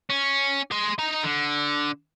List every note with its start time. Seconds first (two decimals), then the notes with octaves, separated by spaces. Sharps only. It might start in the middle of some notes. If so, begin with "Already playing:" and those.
0.10 C#4
0.71 G#4 C6
0.99 D#4 A#5
1.24 D3